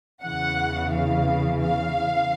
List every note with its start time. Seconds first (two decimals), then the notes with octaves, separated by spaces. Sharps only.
0.23 E2 C#3 E3 F#5
0.92 F5
1.60 F5